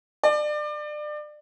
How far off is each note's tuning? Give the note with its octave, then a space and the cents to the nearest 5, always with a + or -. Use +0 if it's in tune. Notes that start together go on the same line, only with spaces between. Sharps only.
D5 +30